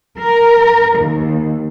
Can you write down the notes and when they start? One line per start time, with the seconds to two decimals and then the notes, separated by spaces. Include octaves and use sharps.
0.19 A#4
0.99 D#2